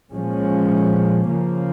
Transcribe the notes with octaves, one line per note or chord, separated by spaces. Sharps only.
A#2 F3 G#3 C#4
C#3 F3 A#3